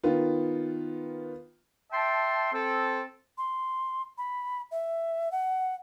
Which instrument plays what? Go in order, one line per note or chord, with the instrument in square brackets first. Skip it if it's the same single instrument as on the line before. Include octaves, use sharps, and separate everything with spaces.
[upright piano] D#3 B3 F4
[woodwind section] E5 G5 A5 C6
C4 A4
[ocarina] C6
B5
E5
F#5